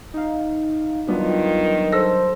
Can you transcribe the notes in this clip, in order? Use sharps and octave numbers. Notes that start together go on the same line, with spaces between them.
D#4 F5
D#3 F#3 G3 B3 D4 F4
A4 C5 E6 A#6